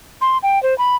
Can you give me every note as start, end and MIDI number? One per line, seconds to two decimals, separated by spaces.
0.21 0.38 84
0.43 0.61 79
0.63 0.77 72
0.78 0.96 83